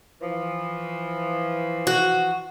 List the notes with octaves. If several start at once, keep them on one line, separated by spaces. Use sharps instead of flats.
E3 F3
F#4